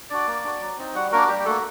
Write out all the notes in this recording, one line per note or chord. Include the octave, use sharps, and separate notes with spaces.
D4 F#4 D5
A#3
D4 F#4
F#3
C4 D#4
G3 F#4 F#5
A#3 D4 F#4 A#4
G3 G4
G4
A3 A#3 F#4 A4